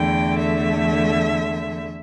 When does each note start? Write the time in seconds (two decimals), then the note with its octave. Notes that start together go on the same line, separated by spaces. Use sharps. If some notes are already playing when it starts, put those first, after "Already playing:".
Already playing: E2 D3 A3 G5
0.40 E5